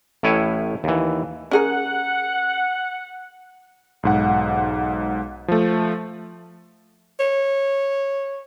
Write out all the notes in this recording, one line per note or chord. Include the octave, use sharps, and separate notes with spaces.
A1 A2 E4 C#5 G#5
D#2 E3
C#4 G#4 A#4 F#5
B1 G#2 F#5
F3 A3
C#5